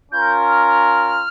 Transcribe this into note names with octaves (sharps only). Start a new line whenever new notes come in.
C#4 F4 A#4 G6
F6
F6